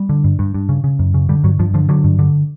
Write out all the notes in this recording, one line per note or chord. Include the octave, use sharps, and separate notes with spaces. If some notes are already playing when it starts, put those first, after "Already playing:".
Already playing: G3
D3
G2
G2
G2
C#3
C#3
F#2
C#3
D3 G3
G2 F#3
G2 F3
D3 F3
D3 F#3
G2
D3